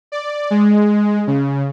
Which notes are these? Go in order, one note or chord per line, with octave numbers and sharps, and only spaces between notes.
D5
G#3
C#3